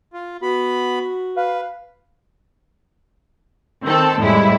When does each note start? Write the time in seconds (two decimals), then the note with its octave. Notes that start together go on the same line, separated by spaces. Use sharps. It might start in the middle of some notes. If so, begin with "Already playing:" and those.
0.13 F4
0.42 B3 F#4 B5
1.36 B4 F5
3.85 D#3 C4 A4
4.18 F2 A2 G3 G#3 E4